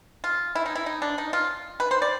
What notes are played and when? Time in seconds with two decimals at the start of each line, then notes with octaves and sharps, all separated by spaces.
0.24 F4
0.55 E4
0.66 D#4
0.75 E4
0.86 D#4
1.02 D4
1.18 D#4
1.33 F4
1.80 B4
1.91 C5
2.02 D5